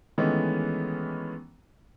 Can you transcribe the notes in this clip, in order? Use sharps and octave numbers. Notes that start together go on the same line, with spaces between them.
D#3 E3 G#3 A3 B3 C#4